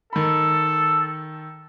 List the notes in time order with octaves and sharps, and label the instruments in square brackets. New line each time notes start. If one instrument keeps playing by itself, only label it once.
[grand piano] D#3 B5 [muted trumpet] A4